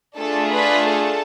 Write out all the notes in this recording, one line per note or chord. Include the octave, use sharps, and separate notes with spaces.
A3 D4 F4 G#4 A4 A5
B4 B5
A4 A5